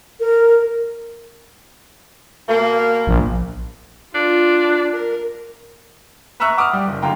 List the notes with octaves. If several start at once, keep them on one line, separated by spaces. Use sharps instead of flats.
A#4
B2 A#3
A#1
D4 F4
A#4
B4 E5 A#5 C#6 E6 F#6
F#5 D6 D#6 F6
G3
F#1
F#2 D3 F5 G5 A#5